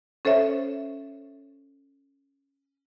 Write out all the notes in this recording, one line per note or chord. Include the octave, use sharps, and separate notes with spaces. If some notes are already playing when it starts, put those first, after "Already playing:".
C#4 A4 C5 C#5 E5